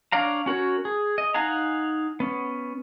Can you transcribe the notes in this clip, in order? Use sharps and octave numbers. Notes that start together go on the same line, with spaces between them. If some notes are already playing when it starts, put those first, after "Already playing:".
D4 C#5 D5 F5 A#5
C#4 F#4 A#4 C#5
G#4
D#5
D#4 F5 F#5 G#5 A#5
B3 C#4